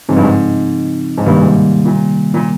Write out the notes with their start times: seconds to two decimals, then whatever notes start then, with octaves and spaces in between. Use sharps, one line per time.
0.09 G#2 C#3 F3 C4 D#4
0.17 G2
0.23 G#2
1.18 G#2
1.26 G2 C3 D#3 G3 A#3
1.41 G#2
1.86 A#2
2.34 A#2